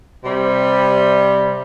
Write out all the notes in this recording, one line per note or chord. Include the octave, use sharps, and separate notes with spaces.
C3 G3